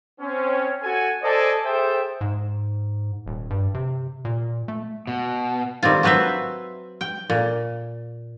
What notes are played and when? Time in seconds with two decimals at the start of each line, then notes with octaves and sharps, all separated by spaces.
0.20 C4 C#4
0.83 F#4 A4 G#5
1.23 A4 C5 D5 D#5 G#5
1.65 G#4 A4 C5 E5 G5
2.21 G#2
3.26 D#1
3.50 G2
3.74 C3
4.25 A#2
4.68 A3
5.07 B2
5.83 D#3 G3 C4 F4
6.03 F#3 C4 B4 C5 E5
7.01 G5
7.30 A#2